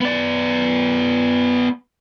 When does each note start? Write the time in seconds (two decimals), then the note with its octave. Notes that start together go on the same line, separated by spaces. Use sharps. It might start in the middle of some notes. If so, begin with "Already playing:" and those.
0.01 B3 D5